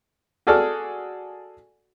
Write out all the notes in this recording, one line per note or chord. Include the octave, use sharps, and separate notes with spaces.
F#4 G#4 A4 D5 F6